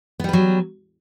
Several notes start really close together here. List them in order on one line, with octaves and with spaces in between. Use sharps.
B3 G3 B4 F#3